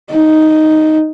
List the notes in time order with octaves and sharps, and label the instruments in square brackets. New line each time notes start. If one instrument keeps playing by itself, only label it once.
[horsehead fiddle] D#4